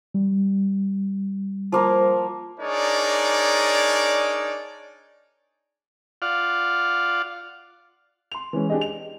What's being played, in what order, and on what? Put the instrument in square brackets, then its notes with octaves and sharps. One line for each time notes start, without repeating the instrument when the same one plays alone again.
[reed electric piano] G3
[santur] F3 A#3 A#4
[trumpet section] D4 D#4 G#4 A#4 C#5 D5
[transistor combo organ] F4 D5 F5 F#5
[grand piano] C6 F7
E3 G#3 C#4
D4 G4 G#4 D#5
F7